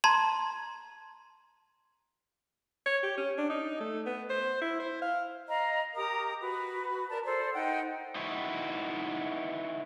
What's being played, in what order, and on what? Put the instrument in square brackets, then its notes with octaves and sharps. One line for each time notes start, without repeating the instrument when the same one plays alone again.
[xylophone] A5 A#5 C6 G#6
[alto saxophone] C#5
G4
C#4
D4
D#4
A3
B3
C5
E4
C5
F5
[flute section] D#5 F5 A#5
G4 A#4 A#5 D#6
F#4 B4
A#4 D5 A5
A4 C5 D5
D#4 F#5 G5
[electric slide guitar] D#4 E4 F#4 B4